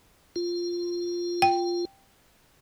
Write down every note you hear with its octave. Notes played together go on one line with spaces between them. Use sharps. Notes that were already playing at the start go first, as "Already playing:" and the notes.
F4
G5